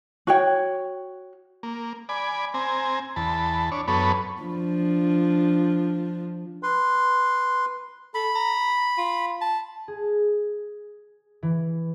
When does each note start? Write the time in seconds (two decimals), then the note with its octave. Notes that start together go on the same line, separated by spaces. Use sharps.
0.27 F#4 C#5 G5
1.63 A#3
2.09 D5 G#5 B5
2.54 C4 G#5 A#5
3.16 E2 A5 B5
3.72 D4 C#5
3.88 F#2 B3 A4 C#5 B5
4.42 F3 D4
6.63 B4 C6
8.14 A4 B5
8.35 A#5
8.97 F4
9.41 A5
9.88 G#4
11.43 E3